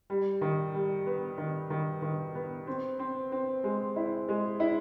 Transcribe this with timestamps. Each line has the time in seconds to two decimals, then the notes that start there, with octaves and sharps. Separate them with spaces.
0.10 G3
0.41 D#3
0.74 G3
1.06 B3
1.38 D#3
1.70 D#3
2.02 D#3
2.35 B3
2.67 C4
2.99 C4
3.32 C4
3.64 G#3
3.96 E4
4.29 G#3
4.60 E4